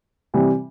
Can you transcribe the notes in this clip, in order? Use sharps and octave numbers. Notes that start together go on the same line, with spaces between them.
C3 E3 G3